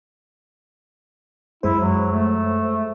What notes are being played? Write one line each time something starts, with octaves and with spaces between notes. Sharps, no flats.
F#2 G#3 E4 C5
F#3
A3